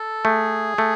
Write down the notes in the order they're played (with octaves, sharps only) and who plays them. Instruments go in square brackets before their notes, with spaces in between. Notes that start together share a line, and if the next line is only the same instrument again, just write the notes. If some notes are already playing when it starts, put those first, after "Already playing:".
Already playing: [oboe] A4
[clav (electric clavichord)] A3 [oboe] G#4
[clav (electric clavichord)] A3